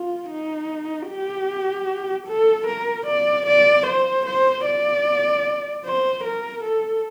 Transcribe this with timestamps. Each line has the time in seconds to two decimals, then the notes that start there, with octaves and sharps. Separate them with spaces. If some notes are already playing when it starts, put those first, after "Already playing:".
Already playing: F4
0.29 D#4
1.09 G4
2.28 A4
2.68 A#4
3.07 D5
3.47 D5
3.87 C5
4.26 C5
4.65 D5
5.85 C5
6.24 A#4
6.64 A4